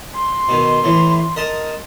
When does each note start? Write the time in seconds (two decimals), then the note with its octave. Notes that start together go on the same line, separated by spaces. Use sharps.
0.16 C6
0.49 B2 D#3
0.84 A2 E3
1.36 A#4 D#5 A5